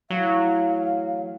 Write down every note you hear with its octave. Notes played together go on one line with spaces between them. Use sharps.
A2 E3 F#3 F5